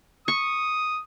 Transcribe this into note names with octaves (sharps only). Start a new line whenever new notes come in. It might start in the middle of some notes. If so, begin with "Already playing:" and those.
C#6 D#6